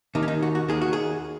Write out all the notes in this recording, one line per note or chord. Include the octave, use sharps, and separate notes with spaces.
D#2 D#3 D#4
C#4
D#4
F#4
F#4
D#2 D#3 G#4
F#4
G#4